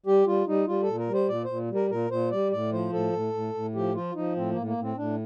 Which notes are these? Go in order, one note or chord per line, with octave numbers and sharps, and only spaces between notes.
G3 G4
G3 F4
G3 D#4
G3 F4
A4
A#2
A#4
G3
C5
A#2 D5
A#2 C5
G3
A#4
A#2 A#4
A#2 C5
G3 D5
A2 D5
F3 C5
A2 A4
A2
A2
A2
F3 G4
F3 F4
F3 D#4
A2 C4
A#3
A2
A#3
A2
C4
A2 D4